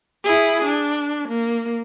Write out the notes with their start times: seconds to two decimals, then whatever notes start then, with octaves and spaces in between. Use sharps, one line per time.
0.24 E4 G#4
0.64 D4
1.28 A#3